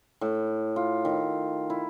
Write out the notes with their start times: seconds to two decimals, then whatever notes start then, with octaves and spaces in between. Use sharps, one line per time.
0.21 A2
0.76 F4
1.05 D#3
1.70 E4